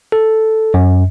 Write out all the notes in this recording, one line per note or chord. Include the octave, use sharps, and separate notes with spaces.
A4
F#2